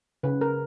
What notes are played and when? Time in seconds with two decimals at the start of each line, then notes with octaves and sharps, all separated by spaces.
0.23 C#3 B4
0.41 A#4